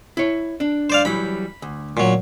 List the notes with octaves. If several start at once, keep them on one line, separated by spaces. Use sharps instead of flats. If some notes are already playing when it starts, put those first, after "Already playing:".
E4 C#5
D4
C5 D5 F5
E3 F#3 G3 B5
D2
A#2 F#3